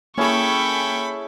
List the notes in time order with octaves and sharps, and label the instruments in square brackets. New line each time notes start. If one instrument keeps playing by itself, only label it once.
[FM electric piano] A#3 [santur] C#4 E4 G#4 [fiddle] A4 B5 [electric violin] G5 C#6